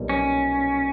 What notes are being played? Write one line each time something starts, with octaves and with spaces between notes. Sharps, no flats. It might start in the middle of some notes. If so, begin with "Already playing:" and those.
Already playing: B1 A#2 G3
C#4